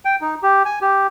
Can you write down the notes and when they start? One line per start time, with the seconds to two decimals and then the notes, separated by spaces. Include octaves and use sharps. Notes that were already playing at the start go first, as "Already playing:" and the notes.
0.05 G5
0.21 D#4
0.43 G4
0.65 G#5
0.81 G4